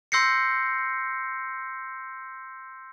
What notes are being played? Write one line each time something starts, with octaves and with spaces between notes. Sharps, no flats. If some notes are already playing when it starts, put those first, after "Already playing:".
C6 E6 G6 A#6 C7 C#7